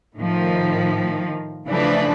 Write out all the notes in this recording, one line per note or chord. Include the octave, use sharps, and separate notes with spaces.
A2 D#3 F3
C#3 E3 F3 A3 D4 B4